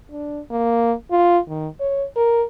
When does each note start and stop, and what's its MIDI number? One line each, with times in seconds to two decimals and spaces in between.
0.11 0.40 62
0.51 0.93 58
1.11 1.39 65
1.48 1.68 51
1.80 2.05 73
2.16 2.44 70